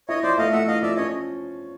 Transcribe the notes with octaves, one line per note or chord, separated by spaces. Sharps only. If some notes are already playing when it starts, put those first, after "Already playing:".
E4 C#5 D#5
F3 C5 D5
A3 D#5 F5
A3 E5 F#5
E4 D#5 F5
F3 D5 E5
C#4 C#5 D#5